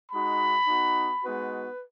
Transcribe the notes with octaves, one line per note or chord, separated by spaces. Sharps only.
G#3 D#4 F#4 B5
B3 D#4 F#4
G#3 B3 D#4 F#4 B4